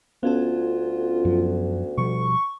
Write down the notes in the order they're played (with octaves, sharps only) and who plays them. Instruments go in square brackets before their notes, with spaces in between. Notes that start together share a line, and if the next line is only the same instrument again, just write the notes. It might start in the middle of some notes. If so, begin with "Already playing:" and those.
[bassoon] D2 [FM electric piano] B3 C#4 A4 [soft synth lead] F4
[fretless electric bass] F#2 F3
[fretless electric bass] B2 F3 G3 [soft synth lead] C#6